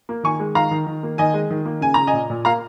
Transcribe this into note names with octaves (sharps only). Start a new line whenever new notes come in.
A#3
D#3 G#5 C#6
G#3
D#3 F5 A#5
D#3
D#3
A#3
D#3 D#5 G#5
G#3
D#3
A#3
C#3 G#5
C#3 A#5
D#5 G#5
A#2
A#2
A#3 F5 A#5